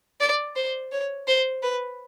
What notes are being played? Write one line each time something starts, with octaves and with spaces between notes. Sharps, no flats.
D5
C5
C#5
C5
B4